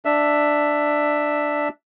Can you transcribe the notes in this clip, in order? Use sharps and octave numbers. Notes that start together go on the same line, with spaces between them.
D4 E5